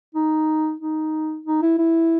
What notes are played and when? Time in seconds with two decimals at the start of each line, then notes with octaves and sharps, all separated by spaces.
0.15 D#4
0.80 D#4
1.46 D#4
1.62 E4
1.78 E4